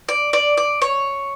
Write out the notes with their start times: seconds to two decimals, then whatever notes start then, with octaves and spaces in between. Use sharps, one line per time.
0.09 D5
0.33 D5
0.57 D5
0.82 C#5